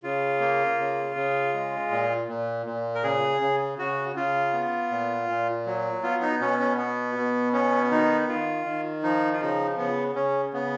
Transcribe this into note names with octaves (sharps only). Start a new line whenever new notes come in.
C#3 F4
A#3
C#3
C#3
G#3
A#2
A#2
A#2
A#4
C#3 G#4
C#3
C#3 F#4
C#3 F4
B3
A#2
A#2
F#3
B3 F4
D#4
B2 C#4
C#4
B3
B2
B3 C#4
D#3 D#4
D#3 F4
D#3
F3 D#4
F4
C#3 D#4
C#3 B3
C#3 C#4
C#3 B3